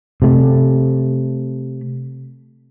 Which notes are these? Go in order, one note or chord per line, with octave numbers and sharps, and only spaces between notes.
C3 A3